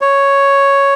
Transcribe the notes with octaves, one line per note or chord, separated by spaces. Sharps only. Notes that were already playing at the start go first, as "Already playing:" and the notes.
C#5